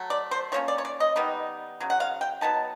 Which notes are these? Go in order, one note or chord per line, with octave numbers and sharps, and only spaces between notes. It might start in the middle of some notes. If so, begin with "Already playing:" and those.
Already playing: F#3 A3
D5
C5
F3 A#3 C#4 C#5
D5
C#5
D5
D#5
D#3 G3 B3 D#4
C#3 F#3
F#5
F5
G5
F#3 B3 D#4 A5